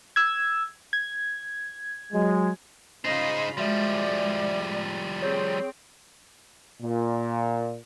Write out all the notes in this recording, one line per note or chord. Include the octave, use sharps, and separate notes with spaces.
E6 G#6
G#6
F#3 G#3
C#3 D#4 F4 C5 D#5 B5 A#6 C7
F3 G3 G#3 F#4 D5 E5
C4 G#4 C#5 G6
A#2